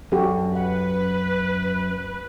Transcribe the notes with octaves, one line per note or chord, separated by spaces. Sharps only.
F#2 F#4 G4 A4
B4 F#5